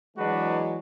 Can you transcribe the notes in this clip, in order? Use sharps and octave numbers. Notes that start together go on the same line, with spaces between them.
E3 F#3 G#3 D4 F#4 B4